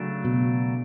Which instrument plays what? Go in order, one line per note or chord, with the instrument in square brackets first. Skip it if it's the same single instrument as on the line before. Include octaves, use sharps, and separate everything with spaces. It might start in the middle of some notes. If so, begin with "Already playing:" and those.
Already playing: [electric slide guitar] C#3 F#3 A3 D4
[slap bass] B2